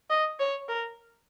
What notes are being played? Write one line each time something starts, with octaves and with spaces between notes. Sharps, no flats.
D#5
C#5
A#4